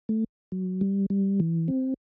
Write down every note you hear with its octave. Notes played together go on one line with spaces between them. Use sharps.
A3
F#3
G3
G3
E3
C4